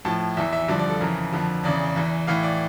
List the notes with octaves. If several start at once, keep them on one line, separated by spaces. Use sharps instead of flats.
A2 F3 A5
E2 E3 E5
E5
G2 D3 F3 D5
D5
A4
F2 C#3 E3 A#4
F2 D3 F3
E2 C#3 E3 D5
E2 E3
A2 E3 F5
D5